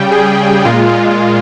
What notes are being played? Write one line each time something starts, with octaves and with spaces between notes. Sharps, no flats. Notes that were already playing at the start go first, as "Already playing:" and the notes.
Already playing: C#3 G3 G5
G#4
A#2 G#3 F4